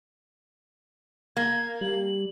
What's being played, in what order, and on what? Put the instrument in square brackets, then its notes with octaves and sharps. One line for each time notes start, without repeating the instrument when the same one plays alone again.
[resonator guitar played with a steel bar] A#3 [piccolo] G#6
[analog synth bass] G3 [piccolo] F#7